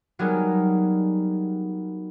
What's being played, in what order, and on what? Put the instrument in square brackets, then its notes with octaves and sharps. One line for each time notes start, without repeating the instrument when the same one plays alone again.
[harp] F#3 G3 B3 D#4 G#4 A#4